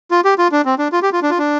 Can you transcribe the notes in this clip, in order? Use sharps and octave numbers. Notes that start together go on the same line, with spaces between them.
F4
G4
F4
D4
C4
D4
F4
G4
F4
D4
F4
D4